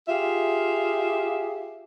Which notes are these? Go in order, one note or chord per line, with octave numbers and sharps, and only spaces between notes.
F4 G4 G#4 E5 F5